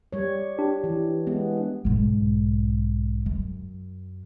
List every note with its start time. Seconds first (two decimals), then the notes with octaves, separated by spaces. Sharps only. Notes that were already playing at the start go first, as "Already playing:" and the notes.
0.12 G3 C#5
0.58 D4 G4
0.84 E3
1.27 G#3 B3
1.85 B1 G#2
3.26 F#2